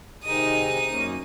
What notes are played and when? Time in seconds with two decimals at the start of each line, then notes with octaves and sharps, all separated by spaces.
0.23 C3 D#3 G#3 D#4 D#6
0.90 F#2 A#3 C#4